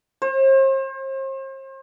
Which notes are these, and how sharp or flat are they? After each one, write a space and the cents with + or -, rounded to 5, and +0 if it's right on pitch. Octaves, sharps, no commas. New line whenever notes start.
C5 +40